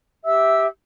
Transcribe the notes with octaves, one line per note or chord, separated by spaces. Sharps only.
G4 E5 E6